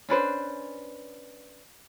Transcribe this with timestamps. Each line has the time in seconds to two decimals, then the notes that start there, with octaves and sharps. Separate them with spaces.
0.09 C#4 D4 B4 C5